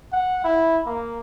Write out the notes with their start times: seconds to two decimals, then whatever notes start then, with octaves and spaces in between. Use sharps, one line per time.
0.12 F#5
0.44 E4
0.86 A#3